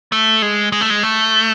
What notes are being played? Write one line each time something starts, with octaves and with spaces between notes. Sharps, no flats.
A3
G#3
G#3
A3
G#3
A3